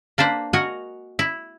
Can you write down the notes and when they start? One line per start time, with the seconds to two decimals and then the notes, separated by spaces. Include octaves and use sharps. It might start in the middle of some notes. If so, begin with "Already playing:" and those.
0.18 A#3 D4 B4 C5
0.53 F#4 A#4 D#5 G#5
1.19 E4